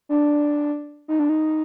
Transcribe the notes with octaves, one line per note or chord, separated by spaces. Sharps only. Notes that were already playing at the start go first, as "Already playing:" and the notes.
D4
D#4
D4
D#4